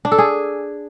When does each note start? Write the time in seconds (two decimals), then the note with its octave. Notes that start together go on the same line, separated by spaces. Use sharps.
0.05 D4
0.12 A4
0.18 G#4